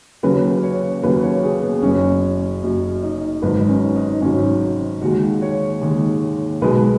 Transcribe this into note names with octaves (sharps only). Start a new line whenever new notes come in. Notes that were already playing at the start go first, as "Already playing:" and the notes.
D#2 C#3 F#3 B4
C#5
D#2 C#3 F#3 B4
C#5
G#4
B3
F#1 F#2 F#3 C#4
F#1 F#2 F#3
D#4
G#1 G#2 F#3 B4
D#4
C#4
D#4
G#1 G#2 F#3 C#4
D#2 D#3 G#3 F#4
C#5
D#2 D#3 G#3
B1 B2 G#3 B4